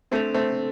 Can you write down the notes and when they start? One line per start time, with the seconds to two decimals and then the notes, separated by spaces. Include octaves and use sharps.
0.11 A3 C4 D4 A4 C5
0.34 A3 C4